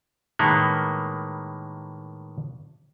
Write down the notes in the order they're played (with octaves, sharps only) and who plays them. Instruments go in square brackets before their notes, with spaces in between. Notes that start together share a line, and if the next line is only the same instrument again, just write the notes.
[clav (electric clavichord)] A2 D#3 G#3 A#3 B3